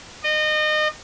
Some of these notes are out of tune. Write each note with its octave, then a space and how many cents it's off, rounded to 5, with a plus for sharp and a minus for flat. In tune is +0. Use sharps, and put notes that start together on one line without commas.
D#5 -30